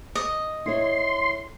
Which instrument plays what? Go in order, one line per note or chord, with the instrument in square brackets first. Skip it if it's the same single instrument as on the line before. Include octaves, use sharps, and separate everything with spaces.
[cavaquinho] D#5
[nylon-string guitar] E4 A4 C#5 [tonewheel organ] C6